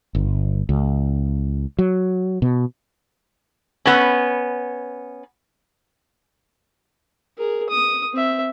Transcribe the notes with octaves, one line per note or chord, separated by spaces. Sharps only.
G1
C#2
F#3
B2
B3 C#4
G#4 A#4
D#6
C4 E5